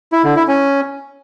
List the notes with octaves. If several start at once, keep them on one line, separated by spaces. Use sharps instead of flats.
E4
D3
E4
C#4